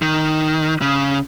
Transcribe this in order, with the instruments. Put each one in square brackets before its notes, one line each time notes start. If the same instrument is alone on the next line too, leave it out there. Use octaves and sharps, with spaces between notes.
[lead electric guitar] D#3
C#3